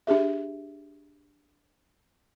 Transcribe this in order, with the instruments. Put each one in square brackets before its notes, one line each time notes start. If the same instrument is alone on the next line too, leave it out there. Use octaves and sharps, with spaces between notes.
[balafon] D4 G4 G#4 E5